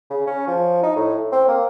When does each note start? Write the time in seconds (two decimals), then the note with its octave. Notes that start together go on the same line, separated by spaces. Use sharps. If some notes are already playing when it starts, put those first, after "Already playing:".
0.10 C#3
0.27 C#4
0.47 F3
0.83 D#4
0.96 A2
1.32 C4
1.48 A#3